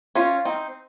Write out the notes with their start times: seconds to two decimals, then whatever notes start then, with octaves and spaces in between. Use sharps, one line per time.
0.15 C#4 F4
0.45 C4 D#4